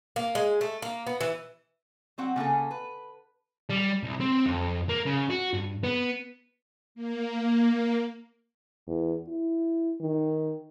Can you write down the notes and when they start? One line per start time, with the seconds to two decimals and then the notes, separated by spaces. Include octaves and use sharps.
0.16 A#3
0.35 G#3
0.61 A3
0.82 A#3
1.07 B3
1.21 E3
2.18 F#3 C4 F#4 F#5
2.36 C#3 A#3 G#4 A4
2.71 B4
3.70 G3
4.03 C2
4.20 C4
4.46 F2
4.89 A#3
5.06 C#3
5.30 F#4
5.54 G2
5.83 B3
6.95 A#3
8.87 E2
9.28 E4
10.01 D#3